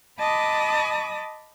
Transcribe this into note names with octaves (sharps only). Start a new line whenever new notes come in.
D#5 A5 B5 D6 D#6